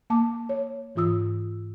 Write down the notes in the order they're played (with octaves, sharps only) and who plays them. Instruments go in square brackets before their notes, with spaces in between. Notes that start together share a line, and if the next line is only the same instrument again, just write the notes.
[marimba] A#3 A5 D6
C#5
G#2 E3 F4 D#6 E6